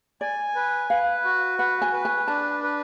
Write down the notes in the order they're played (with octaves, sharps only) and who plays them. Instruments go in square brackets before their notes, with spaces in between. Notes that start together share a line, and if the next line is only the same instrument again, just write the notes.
[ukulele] D5 [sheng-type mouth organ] G#5
[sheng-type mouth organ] B4
[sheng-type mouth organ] B4 [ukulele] F5
[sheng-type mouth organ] F#4
[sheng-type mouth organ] B4 [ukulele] F#5
[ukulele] G#5
[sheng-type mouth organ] B4
[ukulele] G#5
[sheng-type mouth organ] D4 [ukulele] A5
[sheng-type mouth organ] B4